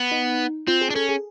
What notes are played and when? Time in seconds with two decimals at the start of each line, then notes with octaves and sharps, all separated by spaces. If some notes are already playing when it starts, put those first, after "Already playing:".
Already playing: B3
0.12 D#4
0.67 C4 F4
0.81 G#4
0.90 D4
0.95 C#4 A4
1.09 G#4